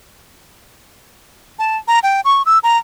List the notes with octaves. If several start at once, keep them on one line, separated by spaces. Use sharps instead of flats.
A5
A#5
G5
C#6
E6
A#5